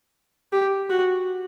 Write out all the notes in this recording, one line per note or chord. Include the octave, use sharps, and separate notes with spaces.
G4
F#4